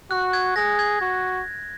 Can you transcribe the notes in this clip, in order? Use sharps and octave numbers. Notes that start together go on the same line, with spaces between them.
F#4 F#6
G#6
G#4 A#6
G#6
F#4